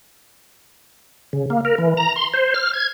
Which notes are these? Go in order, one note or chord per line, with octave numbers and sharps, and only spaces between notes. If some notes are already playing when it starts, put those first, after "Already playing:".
C#3
A#3
A#4
E3
A#5
C6
C5
F6
G#6